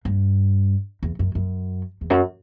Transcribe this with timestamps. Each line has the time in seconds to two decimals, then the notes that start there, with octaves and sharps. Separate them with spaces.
0.05 G2
1.03 E2
1.19 F#2
1.35 F#2
2.01 E2
2.10 F#2